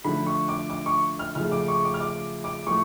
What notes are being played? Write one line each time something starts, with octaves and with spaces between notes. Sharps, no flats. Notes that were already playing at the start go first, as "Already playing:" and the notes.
D3 F3 A3 B5
C#6
D6
D6
C#6
F6
C#3 F3 A3 F6
D6
C#6
D6
F6
D6
D6
A2 F3 A3 C#6